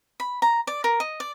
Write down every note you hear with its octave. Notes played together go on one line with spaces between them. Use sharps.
B5
A#5
D5
A#4
D#5
D5